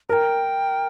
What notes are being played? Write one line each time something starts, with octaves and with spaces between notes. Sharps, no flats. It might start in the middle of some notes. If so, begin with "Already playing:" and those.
A#4 G5 A#5